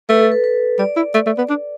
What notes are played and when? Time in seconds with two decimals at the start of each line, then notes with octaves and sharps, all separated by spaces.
0.09 A3 B4
0.20 A4
0.32 B4
0.44 B4
0.79 G3 D5
0.97 E4
1.14 A3
1.26 A3
1.38 B3
1.49 D4